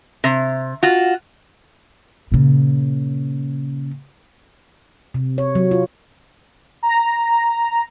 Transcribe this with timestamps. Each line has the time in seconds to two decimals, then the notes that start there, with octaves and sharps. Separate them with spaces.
0.24 C3
0.83 F4 F#4
2.32 A#2 C#3
5.14 C3
5.38 C#5
5.55 F#3
5.71 F4
6.83 A#5